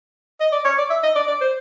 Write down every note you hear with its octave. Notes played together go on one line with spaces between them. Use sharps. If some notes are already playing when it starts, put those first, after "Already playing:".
D#5
D5
C#5
D5
E5
D#5
D5
D5
C5